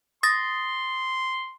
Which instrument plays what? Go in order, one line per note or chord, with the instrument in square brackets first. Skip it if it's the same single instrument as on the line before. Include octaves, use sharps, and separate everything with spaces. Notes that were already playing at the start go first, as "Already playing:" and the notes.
[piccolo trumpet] C6 [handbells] D#6 A6 A#6